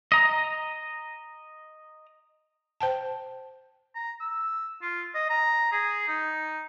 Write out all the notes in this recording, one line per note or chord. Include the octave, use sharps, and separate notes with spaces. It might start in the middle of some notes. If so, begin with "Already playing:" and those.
D#5 A#5
C5 G5 A5
A#5
E6
F4
D#5
A#5
G#4
D#4